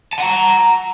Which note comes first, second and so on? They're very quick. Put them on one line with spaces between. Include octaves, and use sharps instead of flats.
A5 F#5 A#5